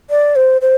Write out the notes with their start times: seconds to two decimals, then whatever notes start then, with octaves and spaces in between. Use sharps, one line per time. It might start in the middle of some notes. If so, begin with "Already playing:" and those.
0.10 D5
0.36 C5
0.62 C5